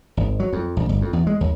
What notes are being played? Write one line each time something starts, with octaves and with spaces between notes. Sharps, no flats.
G#1
F#3
F2
A#1
G1
F2
E2
G#3
D#2